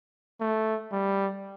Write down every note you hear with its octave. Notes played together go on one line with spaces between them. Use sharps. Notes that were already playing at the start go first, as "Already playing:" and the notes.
A3
G3